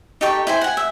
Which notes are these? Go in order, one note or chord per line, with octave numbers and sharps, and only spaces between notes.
D#4 G4 A4 C#6
E4 C5 G#5
F#5 G#5
E5